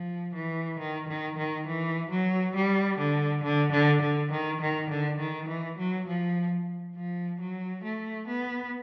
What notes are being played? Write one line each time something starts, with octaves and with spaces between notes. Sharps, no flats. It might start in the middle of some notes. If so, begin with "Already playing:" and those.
Already playing: F3
E3
D#3
D#3
D#3
E3
F#3
G3
D3
D3
D3
D3
D#3
D#3
D3
D#3
E3
F#3
F3
F3
F#3
A3
B3